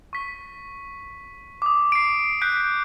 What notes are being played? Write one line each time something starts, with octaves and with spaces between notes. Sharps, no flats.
C#6 B6
D6 D#6
C7 D7
F#6 G6 B6 D7